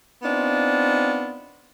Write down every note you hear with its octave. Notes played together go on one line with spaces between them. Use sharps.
B3 C4 D4 D#4 F4